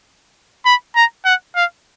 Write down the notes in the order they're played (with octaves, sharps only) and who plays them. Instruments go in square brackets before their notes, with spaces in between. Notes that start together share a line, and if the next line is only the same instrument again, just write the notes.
[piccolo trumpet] B5
A#5
F#5
F5